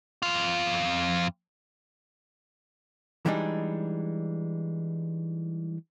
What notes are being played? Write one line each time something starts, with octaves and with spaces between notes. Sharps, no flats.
F2 F4
E3 G3 G#3 D4 D#4